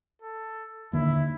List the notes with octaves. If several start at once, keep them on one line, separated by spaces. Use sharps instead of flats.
A4
D#2 D3 A#3 E4